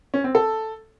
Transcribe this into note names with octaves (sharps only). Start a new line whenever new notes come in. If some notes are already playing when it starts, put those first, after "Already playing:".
C#4
C4
A4